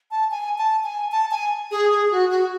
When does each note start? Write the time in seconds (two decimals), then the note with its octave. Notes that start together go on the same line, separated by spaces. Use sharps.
0.11 A5
0.31 G#5
0.58 A5
0.84 G#5
1.12 A5
1.31 G#5
1.71 G#4
1.91 G#4
2.11 F#4
2.30 F#4